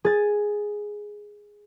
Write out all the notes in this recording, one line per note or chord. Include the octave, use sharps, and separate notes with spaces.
G#4 A6